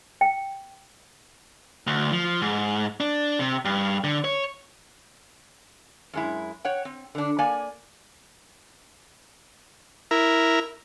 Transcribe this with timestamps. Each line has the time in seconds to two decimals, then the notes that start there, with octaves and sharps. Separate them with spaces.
0.21 G5
1.87 D2
2.12 F3
2.42 G#2
3.00 D4
3.39 C3
3.65 G2
4.04 D3
4.25 C#5
6.13 F#2 G#3 E4
6.65 C#5 F#5 G5
6.85 C4
7.15 D3 D4
7.39 A#3 D5 G#5
10.11 E4 A#4